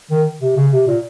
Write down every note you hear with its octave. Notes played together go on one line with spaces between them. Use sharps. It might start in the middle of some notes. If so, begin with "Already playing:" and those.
D#3
C3
C#3
C3
A#2